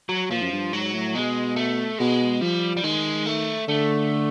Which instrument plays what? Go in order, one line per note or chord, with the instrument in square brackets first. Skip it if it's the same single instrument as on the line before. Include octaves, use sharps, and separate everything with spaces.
[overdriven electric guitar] F#3
[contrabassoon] A#2 [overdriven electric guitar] F3
[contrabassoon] F#2
G2
[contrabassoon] G#2 [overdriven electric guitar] F#3
[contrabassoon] A2
[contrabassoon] B2 [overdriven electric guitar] G#3
[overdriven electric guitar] A3
[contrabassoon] B2 [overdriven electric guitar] G#3
[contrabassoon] F3 [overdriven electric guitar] G3
[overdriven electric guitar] G3
[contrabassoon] D#3 [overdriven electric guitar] G#3
[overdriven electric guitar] A3
[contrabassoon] D3 [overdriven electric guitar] A3